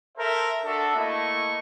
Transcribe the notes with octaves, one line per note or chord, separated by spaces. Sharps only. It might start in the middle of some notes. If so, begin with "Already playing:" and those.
A4 A#4 C5 E5
D4 F#4 A4 E5
A3 A#3 E4 D#5 C#6